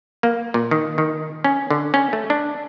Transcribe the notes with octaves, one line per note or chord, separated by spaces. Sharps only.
A#3
A#2
D#3
D#3
C#4
D3
C#4
A3
D4